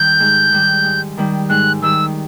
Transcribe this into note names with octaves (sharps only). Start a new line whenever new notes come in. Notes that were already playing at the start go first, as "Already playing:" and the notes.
Already playing: D#3 G3 G6
G#2
D#3 G3
G#2
D#3 G3
G#2 F#6
D#3 G3 E6